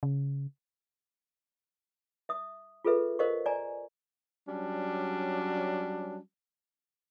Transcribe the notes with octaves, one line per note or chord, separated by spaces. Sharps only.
C#3
E5 D#6
F4 G#4 A4 B4 E5
A#4 C5 D#5 F5 C#6
D5 D#5 G#5 A#5
F#3 G3 C#4 D4